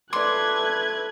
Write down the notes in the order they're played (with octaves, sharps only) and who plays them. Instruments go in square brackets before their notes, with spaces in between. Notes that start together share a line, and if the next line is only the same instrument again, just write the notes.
[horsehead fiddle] A3 B4 [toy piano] D5 D6 [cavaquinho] C6 [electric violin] F#6 G#6